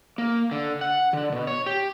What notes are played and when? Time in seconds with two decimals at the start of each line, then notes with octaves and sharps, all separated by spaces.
0.18 A#3
0.51 D3
0.81 F#5
1.13 D3
1.32 B2
1.47 C#5
1.66 G4